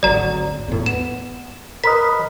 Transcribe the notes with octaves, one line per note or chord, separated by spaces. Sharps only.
G#1 D2 F#3 D5 A#5
E2 A2
B3 E7
A#4 B4 D#5 B6